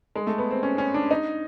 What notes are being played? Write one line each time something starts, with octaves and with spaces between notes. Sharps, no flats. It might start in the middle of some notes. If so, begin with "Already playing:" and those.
G#3
A3
B3
C4
C#4
C#4
D4
D#4